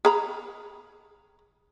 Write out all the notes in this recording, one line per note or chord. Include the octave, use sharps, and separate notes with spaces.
G#4 A#5 B5